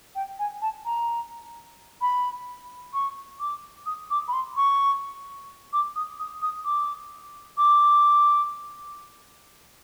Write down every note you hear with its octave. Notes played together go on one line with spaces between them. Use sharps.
G5
G#5
A5
A#5
B5
C#6
D6
D#6
D6
B5
C6
C#6
D6
D#6
D#6
D#6
D6
D6